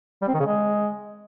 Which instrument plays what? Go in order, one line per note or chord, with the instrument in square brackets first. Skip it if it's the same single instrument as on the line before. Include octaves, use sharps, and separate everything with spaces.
[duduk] G3
C4
D#3
C#3
G#3